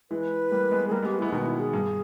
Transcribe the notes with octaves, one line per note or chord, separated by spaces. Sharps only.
E3 G#3 B4
G3 A#3
G#3 B3
G#4
G3 A#3 A#4
G#3 B3
G4
G#3 B3 E4
B2 D#3 D#4
E4
G#4
G2